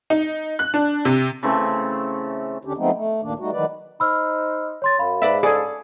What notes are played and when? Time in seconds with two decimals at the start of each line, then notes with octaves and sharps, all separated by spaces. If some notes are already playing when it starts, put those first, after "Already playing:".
0.10 D#4
0.59 F#6
0.74 D4
1.05 C3
1.43 C#3 E3 A3 C4
2.65 D#2 D3 C#4 D4 G4
2.77 F3 G#3 A3 B3 C4 D#4
2.95 A3
3.22 D2 G2 A#2 D#3 A#3 D4
3.39 G3 A3 D#4 F#4
3.52 D#3 E3 F#3 G#3 B4 D5
4.00 D#4 C5 B5 E6 F6
4.82 C#5 C6 A6
4.99 F#2 F5 B5
5.22 G#2 B4 D5 E5
5.43 G#4 A4 D5